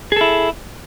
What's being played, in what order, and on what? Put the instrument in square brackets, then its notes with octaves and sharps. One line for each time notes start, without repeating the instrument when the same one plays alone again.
[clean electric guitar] G#4
A4
E4